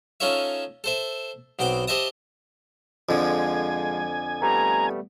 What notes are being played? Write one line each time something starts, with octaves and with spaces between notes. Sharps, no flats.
C#4 D#4 F4 A4 C#5 E5
A4 C5 E5
B1 B2 C4 G5 D6
G4 C5 D#5 E5 A5 D#6
F2 D3 F3 G#3 G#5
G3 A3 B3 A#5